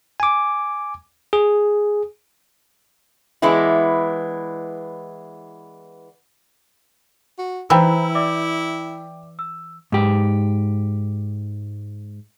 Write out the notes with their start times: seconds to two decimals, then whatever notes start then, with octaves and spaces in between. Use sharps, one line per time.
0.20 G#5 D6
1.33 G#4
3.42 E3 G#3 B3 D4 E4
7.39 F#4
7.70 E3 E4 C5 G5 A#5 B5 E6
8.15 D5 E5 D6
9.39 E6
9.92 G#2 G4